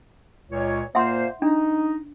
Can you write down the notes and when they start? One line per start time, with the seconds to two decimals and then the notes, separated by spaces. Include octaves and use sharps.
0.50 C#2 A#2 C#5
0.95 A#2 A#3 C5 E5 F#5 C6
1.42 D4 D#4